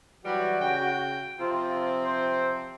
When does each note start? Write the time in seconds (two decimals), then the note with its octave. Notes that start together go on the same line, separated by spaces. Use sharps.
0.24 E3 F#3 G3 F#4
0.60 C#3 G5
1.39 C3 F3 C4 F4
2.05 C5